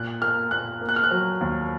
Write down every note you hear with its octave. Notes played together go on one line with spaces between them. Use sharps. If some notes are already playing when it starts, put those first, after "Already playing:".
Already playing: A#2 F#6
A#3 F6
A#2 F#6
A#3
F#6
F6
F#6
F#3
D#2